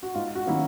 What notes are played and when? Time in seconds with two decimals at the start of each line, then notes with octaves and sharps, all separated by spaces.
0.03 F#4
0.14 G#2 F4
0.35 F#4
0.46 D#3 F#3 A#3 C#4 E4